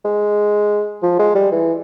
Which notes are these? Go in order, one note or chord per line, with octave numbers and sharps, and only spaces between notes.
G#3
F3
G#3
G3
E3